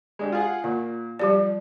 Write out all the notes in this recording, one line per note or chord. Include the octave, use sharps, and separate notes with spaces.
G#3 D4 G4
F4 G#4 F#5
A#2 F4
F3 G3 G4 D5